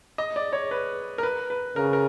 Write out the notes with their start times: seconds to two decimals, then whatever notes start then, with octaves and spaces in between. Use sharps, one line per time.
0.18 D#5
0.36 D5
0.53 C#5
0.71 B4
1.18 A#4
1.23 B4
1.50 B4
1.76 C#3 A#4
1.93 A#4